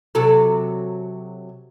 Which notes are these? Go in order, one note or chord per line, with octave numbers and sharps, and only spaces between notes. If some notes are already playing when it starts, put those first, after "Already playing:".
C3 F#3 A4